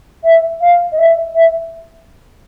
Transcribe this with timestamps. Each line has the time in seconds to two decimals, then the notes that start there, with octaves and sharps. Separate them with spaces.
0.23 E5
0.60 F5
0.91 D#5
0.98 E5
1.34 E5